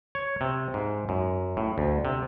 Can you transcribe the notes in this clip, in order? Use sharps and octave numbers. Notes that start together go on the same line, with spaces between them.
C#5
C3
G#2
F#2
A2
D2
C3